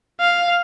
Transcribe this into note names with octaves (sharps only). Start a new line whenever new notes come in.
F5